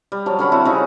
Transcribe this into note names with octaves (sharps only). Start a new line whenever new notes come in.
G3
F3 F#3 C#5
D3 C#4 B5 C#6
C4 E4 F#4
C#3 C#4 D#4